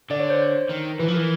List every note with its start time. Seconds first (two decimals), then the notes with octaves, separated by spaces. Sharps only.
0.10 D3 D5
0.20 C#5
0.30 C5
0.70 D#3
0.99 E3 B4
1.08 F3
1.14 E3 A#4